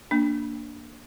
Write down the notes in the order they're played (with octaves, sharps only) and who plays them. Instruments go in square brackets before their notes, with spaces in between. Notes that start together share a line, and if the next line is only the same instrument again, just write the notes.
[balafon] A#3 D4